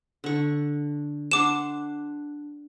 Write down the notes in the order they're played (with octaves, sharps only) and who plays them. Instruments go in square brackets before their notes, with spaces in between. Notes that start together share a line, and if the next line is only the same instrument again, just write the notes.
[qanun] D3 C#6
[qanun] D4 F#5 C6 [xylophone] D6 E7